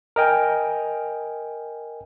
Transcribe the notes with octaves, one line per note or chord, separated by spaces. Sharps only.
A#4 D#5 G5 G#5